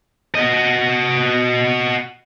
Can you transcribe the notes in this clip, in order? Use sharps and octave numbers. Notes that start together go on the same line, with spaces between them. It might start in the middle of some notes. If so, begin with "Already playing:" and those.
F#4 D#5